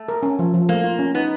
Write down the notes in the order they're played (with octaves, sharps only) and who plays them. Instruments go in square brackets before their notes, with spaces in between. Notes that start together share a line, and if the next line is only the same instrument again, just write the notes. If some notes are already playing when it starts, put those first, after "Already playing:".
Already playing: [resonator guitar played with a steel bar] A3
[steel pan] A#4
C#4
F3
F3
[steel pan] A3 [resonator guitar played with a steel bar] A#3
[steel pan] F4
C#4
[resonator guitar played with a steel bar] B3 [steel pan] D#4